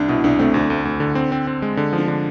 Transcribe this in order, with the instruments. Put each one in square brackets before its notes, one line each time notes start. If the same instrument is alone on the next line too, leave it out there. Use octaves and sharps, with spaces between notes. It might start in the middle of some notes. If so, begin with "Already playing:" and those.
Already playing: [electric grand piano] C2 [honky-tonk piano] D4
[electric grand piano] B2 [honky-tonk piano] E4
[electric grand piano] C2 [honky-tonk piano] D4
[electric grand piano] A3 [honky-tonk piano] C4
[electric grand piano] D2 [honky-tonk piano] D4
[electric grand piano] D2
D2
D3
C4
C4
C4
G#3
D3
F3
[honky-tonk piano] D4
[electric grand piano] D3